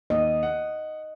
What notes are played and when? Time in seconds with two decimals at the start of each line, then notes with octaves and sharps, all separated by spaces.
0.10 D#2 D#5
0.43 F#5